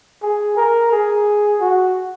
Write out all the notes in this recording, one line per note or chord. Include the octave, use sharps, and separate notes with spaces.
G#4
A#4
G#4
F#4